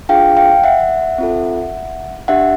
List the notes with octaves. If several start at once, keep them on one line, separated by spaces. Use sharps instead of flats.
D4 F4 G#4 F5 G5
F5 G5
E5 F#5
C4 F4 A4
D4 G4 E5 F#5